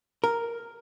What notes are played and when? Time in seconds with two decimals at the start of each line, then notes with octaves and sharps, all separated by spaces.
0.24 A#4